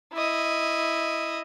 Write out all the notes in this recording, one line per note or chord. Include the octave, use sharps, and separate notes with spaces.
E4 D#5